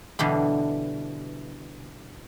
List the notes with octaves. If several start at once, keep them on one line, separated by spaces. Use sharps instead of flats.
B2 D3 E3 G3